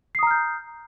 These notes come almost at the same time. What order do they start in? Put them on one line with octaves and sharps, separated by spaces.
C7 D#6 A#5 F6 G6